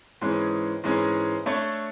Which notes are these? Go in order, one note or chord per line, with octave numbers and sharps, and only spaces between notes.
G#2 E3 G#3 C#4 G#4
G#2 E3 G#3 C#4 G#4
A3 D4 A4 C#5